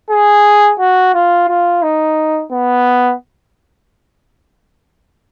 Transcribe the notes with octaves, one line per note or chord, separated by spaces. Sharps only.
G#4
F#4
F4
F4
D#4
B3